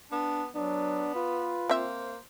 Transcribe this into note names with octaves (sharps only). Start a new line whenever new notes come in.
B3 D4
F#3 B3 D4
F4 B4
A#3 C4 C5 E5